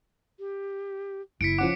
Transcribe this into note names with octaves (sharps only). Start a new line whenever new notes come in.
G4
F#1 E4 B6 C#7 D7
F3 C#4 F#5 D6